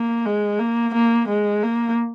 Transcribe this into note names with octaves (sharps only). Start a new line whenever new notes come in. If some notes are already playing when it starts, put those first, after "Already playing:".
Already playing: A#3
G#3
A#3
A#3
G#3
A#3